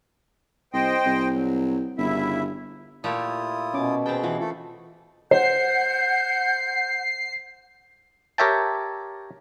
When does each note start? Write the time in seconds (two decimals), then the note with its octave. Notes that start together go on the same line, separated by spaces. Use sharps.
0.73 C2 C5 D#5 G5
1.06 C2
1.32 F#3
1.98 G1 C#3 E4 E5
3.04 A#2 A3 E4 F4 G4 D#6
3.74 B2 C#4 D6
4.06 C4 G#4 B4 G5 A5
4.24 E3 F4
4.41 A3 F4 A4
5.31 C5 F#5 G6 C7
8.38 G4 A#4 C#5 E5 G5 A5